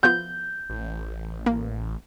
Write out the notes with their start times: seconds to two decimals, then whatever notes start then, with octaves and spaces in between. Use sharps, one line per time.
0.03 F3 B3 F4 G6
0.69 A1
1.46 A#3